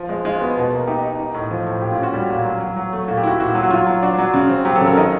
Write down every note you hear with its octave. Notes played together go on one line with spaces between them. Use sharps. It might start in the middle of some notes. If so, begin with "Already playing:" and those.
Already playing: F3
G#3
G#3 F4
B3 F#4
B2
A#3
D#4 G4
D#4
D#4
A2
F3
A2
A#2 G4
F4
C#4 F#4
G3 G4
A#2
F#3
F#3
F#3
A3
A#2 F#4
G4
E4 F#4
A#2 F#4
F#3
F#4
F#3 F4
F#3
D4 F#4
F#3
C#3
C4
F#3 G4
A4
C#3
A#4
D#3 D#5